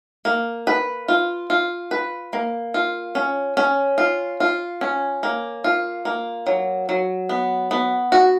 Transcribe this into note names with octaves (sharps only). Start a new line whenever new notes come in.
A#3
B4
F4
F4
B4
A#3
F4
C#4
C#4
F4
F4
C#4
A#3
F4
A#3
F#3
F#3
B3
B3
F#4